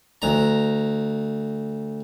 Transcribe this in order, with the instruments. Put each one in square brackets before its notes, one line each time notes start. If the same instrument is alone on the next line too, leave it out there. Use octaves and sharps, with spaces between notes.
[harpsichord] D2 A#5